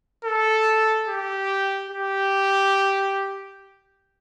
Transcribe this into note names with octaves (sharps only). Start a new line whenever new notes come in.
A4
G4
G4